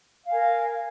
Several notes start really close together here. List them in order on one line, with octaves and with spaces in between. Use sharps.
F5 G#5 A#4